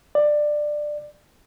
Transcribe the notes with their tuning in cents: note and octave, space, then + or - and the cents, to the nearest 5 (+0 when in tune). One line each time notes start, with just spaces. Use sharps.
D5 +15